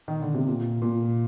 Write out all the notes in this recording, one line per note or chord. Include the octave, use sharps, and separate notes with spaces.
D#3
D3
C3
A#2
A#2